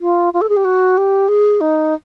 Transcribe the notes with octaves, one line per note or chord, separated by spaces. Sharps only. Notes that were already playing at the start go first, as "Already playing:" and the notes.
F4
F4
A4
G#4
G4
F#4
G4
G#4
D#4